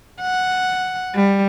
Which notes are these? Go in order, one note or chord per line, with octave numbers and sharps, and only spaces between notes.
F#5
G3